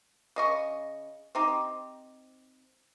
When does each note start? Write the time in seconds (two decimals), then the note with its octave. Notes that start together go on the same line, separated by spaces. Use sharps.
0.36 C#3 D#5 C#6
1.35 C4 D#4 G4